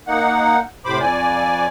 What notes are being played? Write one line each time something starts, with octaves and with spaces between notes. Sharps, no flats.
A#3 D#4 F#5
A2 C3 C5 B5 D6
F2 D5 G#5